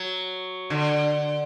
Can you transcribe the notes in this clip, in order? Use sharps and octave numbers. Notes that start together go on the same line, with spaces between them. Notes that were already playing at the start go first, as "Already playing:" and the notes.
Already playing: F#3
D3